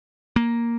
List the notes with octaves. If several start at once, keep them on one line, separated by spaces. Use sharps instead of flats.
A#3